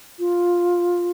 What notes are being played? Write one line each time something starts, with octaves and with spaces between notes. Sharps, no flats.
F4